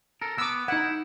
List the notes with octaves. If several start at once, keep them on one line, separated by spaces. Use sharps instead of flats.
A4 A#4
B3 D6 E6
D#4 E4 F#5